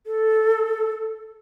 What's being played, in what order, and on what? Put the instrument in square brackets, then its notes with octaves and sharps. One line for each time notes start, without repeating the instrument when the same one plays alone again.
[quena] A4